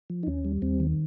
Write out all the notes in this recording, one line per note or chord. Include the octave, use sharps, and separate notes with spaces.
F3
D#4
D#2 C#4
G3
D#2 C4
D#3